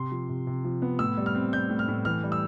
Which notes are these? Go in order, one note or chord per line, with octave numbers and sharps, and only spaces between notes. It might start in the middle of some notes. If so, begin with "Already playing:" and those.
Already playing: C3 C6
F3
C3
C3
F3
B3
A2 E6
G3
F6
C4
G3 G6
A2
F6
A2
E3 F6
G3
E6